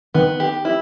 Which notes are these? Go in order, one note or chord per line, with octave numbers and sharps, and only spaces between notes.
D#3 B3
G4
E4